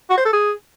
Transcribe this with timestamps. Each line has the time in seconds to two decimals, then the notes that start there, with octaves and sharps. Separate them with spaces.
0.10 F#4
0.17 C5
0.25 A4
0.33 G#4